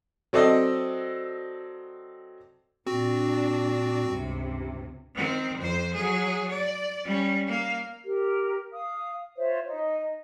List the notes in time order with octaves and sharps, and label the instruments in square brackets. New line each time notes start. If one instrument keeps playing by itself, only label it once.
[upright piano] F#3 C4 A4 D5 D#5
[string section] A#2 D4 [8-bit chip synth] C4 F#4
[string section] C#2 G2 C3
[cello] D#3 C4
F2 C5
F#3 G#4
D5
G3 C#4
A#3 F5
[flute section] G4 A#4
F5 D#6
F4 C5 C#5 E5
D#4 D#5